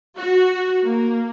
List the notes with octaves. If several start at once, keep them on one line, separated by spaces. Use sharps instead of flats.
F#4
A#3